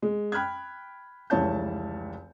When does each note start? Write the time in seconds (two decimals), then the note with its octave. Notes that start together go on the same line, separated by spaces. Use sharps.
0.02 G#3
0.32 G5 B5 F6 F#6 G#6
1.30 F1 C#2 E3 C#5 A5 G6